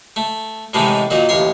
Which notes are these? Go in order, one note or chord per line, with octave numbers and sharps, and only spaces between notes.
A3
A2 C3 D#3 E3 G#3 A3
A#2 D#3 F#3 D#4
A1 D#2 C#5 C6